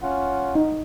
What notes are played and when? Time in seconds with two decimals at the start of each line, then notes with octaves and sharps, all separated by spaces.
0.02 C#4 F4 F#5
0.55 D#4